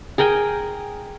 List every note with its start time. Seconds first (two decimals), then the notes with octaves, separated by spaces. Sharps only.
0.18 G#4 A#4 G5 G#5